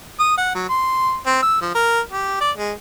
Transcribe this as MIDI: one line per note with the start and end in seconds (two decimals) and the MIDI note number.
0.19 0.34 87
0.37 0.53 78
0.55 0.65 54
0.69 1.16 84
1.26 1.40 60
1.42 1.58 88
1.61 1.73 53
1.74 2.00 70
2.12 2.40 67
2.41 2.51 74
2.58 2.72 56